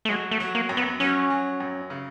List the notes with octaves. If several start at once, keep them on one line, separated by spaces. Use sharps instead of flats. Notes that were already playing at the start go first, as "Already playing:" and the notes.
A3
F#3 G#3
A3
F#3
A#3
F#2
B3
F#3 C#4
F#3
F#2
C#3